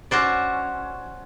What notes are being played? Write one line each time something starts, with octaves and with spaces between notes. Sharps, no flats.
C#4 F#4 C5 D5